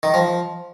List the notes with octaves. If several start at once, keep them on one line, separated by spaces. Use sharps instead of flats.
D#3
F3